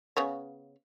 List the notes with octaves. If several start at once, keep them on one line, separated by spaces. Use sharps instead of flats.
C#3 B3 C#5